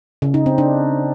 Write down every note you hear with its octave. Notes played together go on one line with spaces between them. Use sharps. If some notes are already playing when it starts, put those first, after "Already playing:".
C#3
D#4
C4
D4